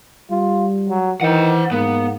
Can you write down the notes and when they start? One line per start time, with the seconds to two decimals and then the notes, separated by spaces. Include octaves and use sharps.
0.31 G3 F4
0.89 F#3
1.21 D#3 E3 C5 F#5
1.72 G#2 A#3 B3